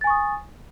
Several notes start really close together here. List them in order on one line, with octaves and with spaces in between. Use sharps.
A6 G#5 C#6 D#6